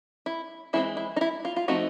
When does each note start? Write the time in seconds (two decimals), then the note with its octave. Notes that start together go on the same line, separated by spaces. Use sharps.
0.26 E4
0.73 E3 G#3 C4 E4
0.97 E4
1.16 D#4
1.21 E4
1.45 F4
1.56 F4
1.68 F3 A3 C4 D#4 F#4